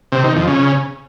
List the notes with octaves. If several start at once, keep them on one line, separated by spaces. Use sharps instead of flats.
C3
D#3
F2
C#3